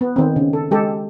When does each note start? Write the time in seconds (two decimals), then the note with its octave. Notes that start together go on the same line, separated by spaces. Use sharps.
0.01 B3
0.16 D#3 C4
0.36 C#3
0.53 A4
0.71 G#3 G4 A4